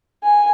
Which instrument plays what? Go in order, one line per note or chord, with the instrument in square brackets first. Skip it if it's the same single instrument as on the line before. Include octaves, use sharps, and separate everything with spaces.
[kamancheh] G#5